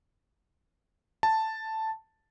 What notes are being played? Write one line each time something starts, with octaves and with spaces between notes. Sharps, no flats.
A5